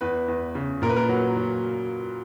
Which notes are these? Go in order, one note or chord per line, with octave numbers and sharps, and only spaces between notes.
E2 B4
E2
C#3
A#2 A#4
B4
A#4
F#3
F#3